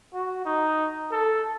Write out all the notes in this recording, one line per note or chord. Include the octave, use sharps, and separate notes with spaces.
F#4
D#4
A4